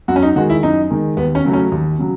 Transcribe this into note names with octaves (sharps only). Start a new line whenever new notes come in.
F#2 F#4
C#4
D#4
D#3 G#3 F#4
E4
F#2 D#4
D#3 G#3
D#2 B3
C#4
C#3 F#3 A3
C#4
D#2
C#3 F#3